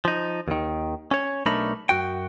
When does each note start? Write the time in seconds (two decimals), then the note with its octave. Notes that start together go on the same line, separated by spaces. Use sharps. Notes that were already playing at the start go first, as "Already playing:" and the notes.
0.05 F3 D#4
0.48 D#2 D#3
1.11 C#4 C#5
1.46 B1 A3 D4 D#4 A#4 B5
1.89 F#2 F#4 G5